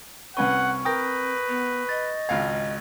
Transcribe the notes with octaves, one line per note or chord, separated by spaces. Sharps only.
C2 C4 C#4 B4 F#5 C#6
A#4 B4 G5 D#6 G6 A#6
B3
D#5 A6
G#1 C#2 F5 G#6